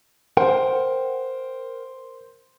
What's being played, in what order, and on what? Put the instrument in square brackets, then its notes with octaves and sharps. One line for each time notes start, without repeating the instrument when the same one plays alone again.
[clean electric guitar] A#4 F#5 G5 [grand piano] C5